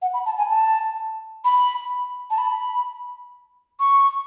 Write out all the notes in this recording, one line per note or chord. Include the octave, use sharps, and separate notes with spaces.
F#5
B5
A5
G#5
A5
B5
A5
B5
C#6